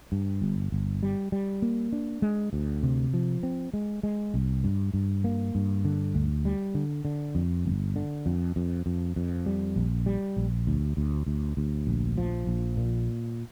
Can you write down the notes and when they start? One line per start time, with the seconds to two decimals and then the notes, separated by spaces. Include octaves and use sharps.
0.12 G2
0.42 G1
0.72 G1
1.03 G3
1.32 G3
1.62 A#3
1.93 D4
2.22 G#3
2.53 D2
2.83 C3
3.14 F3
3.43 C4
3.74 G#3
4.03 G#3
4.34 C2
4.64 G2
4.94 G2
5.24 A#3
5.55 G2
5.85 D3
6.15 D2
6.45 G3
6.75 D3
7.05 D3
7.35 F2
7.66 G1
7.96 D3
8.26 F2
8.56 F2
8.86 F2
9.16 F2
9.46 G3
9.76 A#1
10.06 G3
10.37 A#1
10.67 D2
10.97 D2
11.27 D2
11.57 D2
11.87 A#1
12.18 F3
12.47 A#1
12.77 A#2